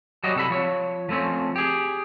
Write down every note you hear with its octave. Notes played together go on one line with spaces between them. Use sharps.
F#3 G3 F#4 D#5
C3 A4 B5
F3 C#5
F3 A3 C4 C#4
G4 G#4